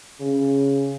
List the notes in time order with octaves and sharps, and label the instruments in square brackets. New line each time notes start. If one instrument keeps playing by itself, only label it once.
[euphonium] C#3